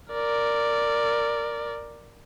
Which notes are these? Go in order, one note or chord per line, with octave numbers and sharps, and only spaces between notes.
A#4 D5